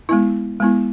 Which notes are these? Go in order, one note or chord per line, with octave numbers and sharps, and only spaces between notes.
G#3 B3 E4
G#3 B3 E4